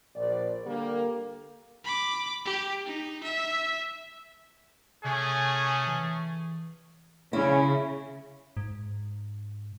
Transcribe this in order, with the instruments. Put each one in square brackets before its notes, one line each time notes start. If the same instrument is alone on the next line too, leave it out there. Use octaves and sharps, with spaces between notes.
[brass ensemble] A#1 D5
D3 G3 A#3
[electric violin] B5 D6
G4
D#4
E5
[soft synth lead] C3 [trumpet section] A3 C#4 G#4
[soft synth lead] E3
[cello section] C#3 [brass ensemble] C#4 [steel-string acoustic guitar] E4
[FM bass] G#2